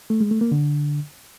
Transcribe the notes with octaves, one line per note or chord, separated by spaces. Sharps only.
A3
G#3
A3
A#3
D3